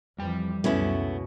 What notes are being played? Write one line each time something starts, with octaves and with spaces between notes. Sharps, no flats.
F2 E3 F3 G3 G5
C#2 F#2 B2 A3 B3 C#4 E4